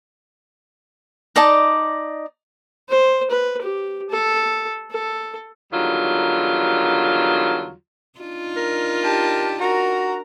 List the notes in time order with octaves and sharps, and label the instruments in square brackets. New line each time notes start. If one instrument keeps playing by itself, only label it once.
[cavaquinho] D#4 D5 D#5 A5
[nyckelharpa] C5
B4
G4
A4
A4
[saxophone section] E2 D3 D#3 F#3 G3 F4
[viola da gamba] D4 D#4 F4
[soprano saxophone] A#4
[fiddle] G4 A5
[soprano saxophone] F#4 [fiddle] A#4 A#5